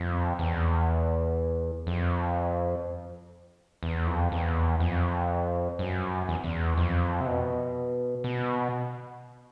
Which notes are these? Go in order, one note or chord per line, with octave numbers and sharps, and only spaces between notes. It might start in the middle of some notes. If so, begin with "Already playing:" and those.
Already playing: F2
E2
F2
E2
F2
E2
F2
F#2
E2
E2
F2
C3
B2
B2